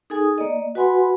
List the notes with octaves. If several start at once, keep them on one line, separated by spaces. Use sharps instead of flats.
D#4 G#4 A4 G#5 D#6
A#3 D5 D#5
F#4 B4 F#5 G#5 B5 C6